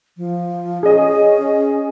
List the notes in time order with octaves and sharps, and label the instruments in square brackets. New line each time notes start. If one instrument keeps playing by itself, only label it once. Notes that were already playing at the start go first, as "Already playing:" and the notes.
[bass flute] F3
[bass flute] C#4 [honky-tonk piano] G#4 D#5